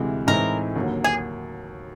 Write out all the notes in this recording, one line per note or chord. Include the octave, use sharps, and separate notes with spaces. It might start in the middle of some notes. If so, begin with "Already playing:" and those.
Already playing: D2 C3 E3 G#3
A2 E3 G#3 C4 D#4 A#4
D#2 D3 F#3 A#3
G#4